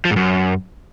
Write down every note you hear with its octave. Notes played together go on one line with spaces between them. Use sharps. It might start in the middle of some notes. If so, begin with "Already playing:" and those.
F3
G#2
F#2